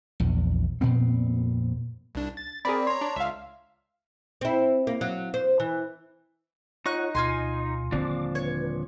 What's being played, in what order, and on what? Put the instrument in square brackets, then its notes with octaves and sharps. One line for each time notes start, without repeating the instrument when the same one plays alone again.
[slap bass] A#1 E2
F2 A#2 B3 C4
[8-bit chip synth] C2 D4
A6
[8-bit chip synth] C4 [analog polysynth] G#4 A#4 D5 [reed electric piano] B5
[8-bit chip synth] C#5 A#5 [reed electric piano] C6
[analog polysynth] D4
[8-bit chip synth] C#2 [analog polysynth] E5 F5
[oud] C4 E4
A#3
F#3
C5
E3
[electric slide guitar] D#4 [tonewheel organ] F4 C#5 F#5 [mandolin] C#6 F#6
[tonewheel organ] D2 B2 [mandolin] F4 G#5 C6
[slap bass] D#1 D3 C4 [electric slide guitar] A#2 F3 D4 [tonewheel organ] D6
[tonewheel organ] B4 [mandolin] C#5